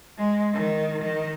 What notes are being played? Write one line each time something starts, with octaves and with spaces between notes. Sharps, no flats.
G#3
D#3
D#3